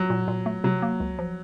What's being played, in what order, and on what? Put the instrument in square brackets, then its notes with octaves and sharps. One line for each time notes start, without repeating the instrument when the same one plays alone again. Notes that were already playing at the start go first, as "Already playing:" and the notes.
Already playing: [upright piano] F#3
[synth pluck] A#2
A#2
A3
[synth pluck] C3 [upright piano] F#3
[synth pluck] A#3
C#2
F3